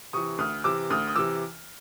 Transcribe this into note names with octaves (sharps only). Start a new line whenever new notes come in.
C3 E3 C#6 D#6
D2 D#6 F6
C3 E3 D6 E6
D2 D#6 F6
D#6
C3 E3 D6 E6